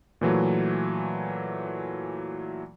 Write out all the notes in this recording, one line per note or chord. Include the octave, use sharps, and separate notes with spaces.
A#2 E3 F#3 A3